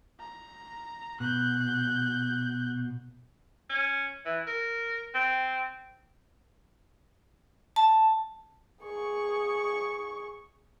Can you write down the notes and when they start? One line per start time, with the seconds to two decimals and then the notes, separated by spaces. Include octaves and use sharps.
0.20 A#5
1.20 B2 F#6 G6
3.70 C#4
4.25 E3
4.47 A#4
5.14 C4
7.76 A5
8.84 G#4 C#6